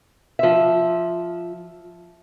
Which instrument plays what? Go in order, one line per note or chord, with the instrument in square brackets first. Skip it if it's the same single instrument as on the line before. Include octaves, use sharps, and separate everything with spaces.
[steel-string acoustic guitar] F3 E5